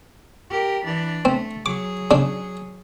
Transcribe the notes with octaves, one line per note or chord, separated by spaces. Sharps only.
G4 A#4
E3 D4
A3 C4
F#3 G#4 D6
C#3 D4